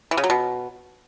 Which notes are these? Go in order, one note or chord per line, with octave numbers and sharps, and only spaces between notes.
E3
C#3
F#3
B2